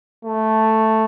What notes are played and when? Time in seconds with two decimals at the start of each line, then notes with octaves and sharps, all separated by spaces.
0.25 A3